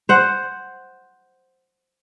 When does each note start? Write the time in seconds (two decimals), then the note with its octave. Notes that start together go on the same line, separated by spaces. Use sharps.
0.09 C5 F#5